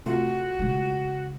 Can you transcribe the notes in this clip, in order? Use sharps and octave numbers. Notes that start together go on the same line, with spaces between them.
C3 A3 F4 F#4
C#3 G#3